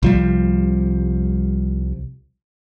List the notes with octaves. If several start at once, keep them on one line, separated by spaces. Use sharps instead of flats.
C2 F3 G3